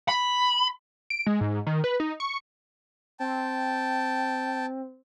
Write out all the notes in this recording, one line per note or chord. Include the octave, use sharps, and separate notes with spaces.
B5
D7
G#3
G#2
D#3
B4
D#4
C#6
C4 G5 A5